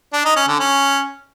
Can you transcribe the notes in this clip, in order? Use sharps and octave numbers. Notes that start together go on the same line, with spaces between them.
D4
D#4
C#4
D3
C#4